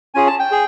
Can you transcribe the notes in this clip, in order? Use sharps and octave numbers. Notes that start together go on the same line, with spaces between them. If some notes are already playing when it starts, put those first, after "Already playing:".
C#4 F4 G#4 G#5
A5
G5
G#4